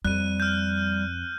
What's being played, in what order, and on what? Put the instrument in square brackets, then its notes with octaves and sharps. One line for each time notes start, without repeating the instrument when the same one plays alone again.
[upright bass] F2 [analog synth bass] G3 [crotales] F#6 D#7
[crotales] F6 G6